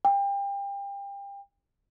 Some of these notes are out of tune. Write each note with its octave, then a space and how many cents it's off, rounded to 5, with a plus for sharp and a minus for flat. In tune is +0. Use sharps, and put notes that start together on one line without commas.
G5 +30